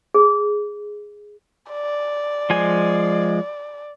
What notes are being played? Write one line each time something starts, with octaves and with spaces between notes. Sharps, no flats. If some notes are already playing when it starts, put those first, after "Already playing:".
G#4
D5
F3 G#3 G#5